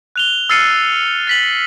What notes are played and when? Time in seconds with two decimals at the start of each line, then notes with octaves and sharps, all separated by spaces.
0.16 F#6 F7 G7
0.50 E6 F6 A6 C7 C#7 D#7
1.27 A6 B6 F#7